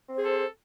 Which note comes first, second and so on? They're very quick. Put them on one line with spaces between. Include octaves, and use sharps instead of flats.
C4 C5 G#4 A4